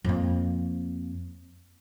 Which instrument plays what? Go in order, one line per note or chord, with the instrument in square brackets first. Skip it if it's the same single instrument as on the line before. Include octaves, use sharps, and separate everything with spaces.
[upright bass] F2 A#3